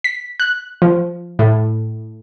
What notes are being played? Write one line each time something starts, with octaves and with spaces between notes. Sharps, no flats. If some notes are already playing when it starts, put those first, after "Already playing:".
B6
F#6
F3
A2